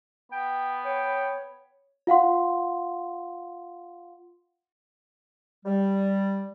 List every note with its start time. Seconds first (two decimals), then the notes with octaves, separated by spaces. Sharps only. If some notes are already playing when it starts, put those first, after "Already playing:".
0.32 B3 G5
0.85 C#5 G5
2.07 F4 F5 F#5 C6
5.65 G3